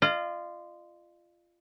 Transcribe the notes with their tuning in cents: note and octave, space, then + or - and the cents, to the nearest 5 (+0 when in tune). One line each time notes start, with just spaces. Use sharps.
F4 -15 D#5 -45